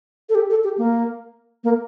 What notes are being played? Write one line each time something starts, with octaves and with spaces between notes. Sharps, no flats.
A4
G4
A4
G4
A#3
A#3